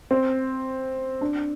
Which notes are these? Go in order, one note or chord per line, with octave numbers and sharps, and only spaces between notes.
C4
D4